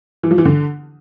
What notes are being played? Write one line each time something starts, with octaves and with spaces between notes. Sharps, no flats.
E3
F3
E3
D3